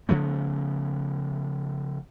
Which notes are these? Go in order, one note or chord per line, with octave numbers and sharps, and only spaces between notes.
C#3 F3 A3 B3